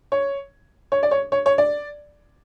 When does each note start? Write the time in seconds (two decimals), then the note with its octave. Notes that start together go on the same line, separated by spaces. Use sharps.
0.12 C#5
0.92 C#5
1.03 D5
1.11 C#5
1.32 C#5
1.46 C#5
1.58 D5